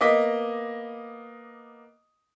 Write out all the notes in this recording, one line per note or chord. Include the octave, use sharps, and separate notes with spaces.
A#3 B3 D#5 D6 B6